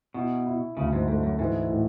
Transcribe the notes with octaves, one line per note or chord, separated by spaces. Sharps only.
B2 E4
E4
D2 C#3
G#2
G#2 A3
F#2
G#2 E3
A2